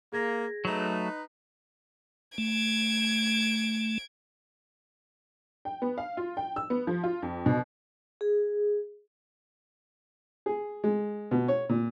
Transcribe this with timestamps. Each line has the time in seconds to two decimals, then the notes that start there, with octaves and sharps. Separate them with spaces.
0.13 A#3 G#4 G#6 A#6
0.65 F#3 A3 D#4 B4
2.38 A3 G#6 D7
5.65 G5
5.82 B3
5.98 F5
6.17 F4
6.37 G5
6.56 E6
6.70 B3
6.87 F3
7.04 F4
7.22 F2
7.46 B2
8.21 G#4
10.46 G#4
10.84 G#3
11.31 B2
11.48 C#5
11.69 A#2